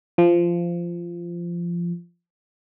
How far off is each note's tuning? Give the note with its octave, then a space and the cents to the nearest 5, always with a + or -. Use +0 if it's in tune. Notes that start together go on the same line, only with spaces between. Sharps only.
F3 -15